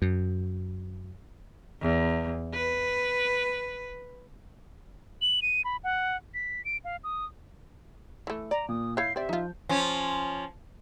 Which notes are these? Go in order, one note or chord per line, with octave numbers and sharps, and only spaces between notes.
F#2
E2
B4
F#7
D#7
B5
F#5
B6
D7
F5
D#6
E3 A3
D5 A#5
A#2 D#6
E4 C#5 F5 G6 C7
C4 G4 D5 E5
F3 D#4 F4
F3 C#4